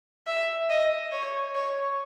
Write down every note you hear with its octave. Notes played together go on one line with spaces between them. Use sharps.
E5
D#5
C#5
C#5